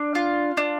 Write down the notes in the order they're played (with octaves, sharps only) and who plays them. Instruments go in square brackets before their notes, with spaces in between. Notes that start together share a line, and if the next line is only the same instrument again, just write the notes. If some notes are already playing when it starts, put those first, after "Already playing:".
Already playing: [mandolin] D4
F4
D4